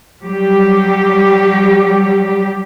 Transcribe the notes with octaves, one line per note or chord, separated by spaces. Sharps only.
F#3 G3 G4